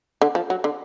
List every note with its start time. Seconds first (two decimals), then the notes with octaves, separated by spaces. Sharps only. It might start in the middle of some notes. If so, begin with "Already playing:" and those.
0.22 D3
0.35 F3
0.50 F#3
0.64 D3